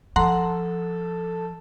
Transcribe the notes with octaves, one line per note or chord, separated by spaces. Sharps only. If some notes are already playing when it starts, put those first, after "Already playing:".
F3 A4 F#5 A#5 C6